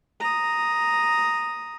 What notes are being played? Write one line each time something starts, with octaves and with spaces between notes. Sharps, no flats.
A#5 D#6